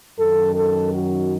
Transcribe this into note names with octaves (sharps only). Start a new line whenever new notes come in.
F#2 D#3 A4
A4
F#4